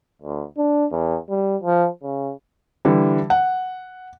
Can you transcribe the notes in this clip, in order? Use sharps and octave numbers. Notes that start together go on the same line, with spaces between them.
D2
D4
E2
G3
F3
C#3
D3 E3 G3
F#5